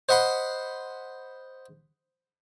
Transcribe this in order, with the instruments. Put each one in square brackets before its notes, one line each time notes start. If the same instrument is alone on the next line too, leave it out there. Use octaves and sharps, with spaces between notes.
[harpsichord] C5 D#5 F#5 B5 C6